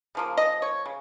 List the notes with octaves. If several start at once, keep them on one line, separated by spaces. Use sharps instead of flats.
C#3 F3 A#3
D#5
C#5
C#3